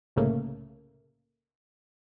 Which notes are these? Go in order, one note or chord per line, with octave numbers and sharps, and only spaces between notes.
C2 A2 C#3 A3 A#3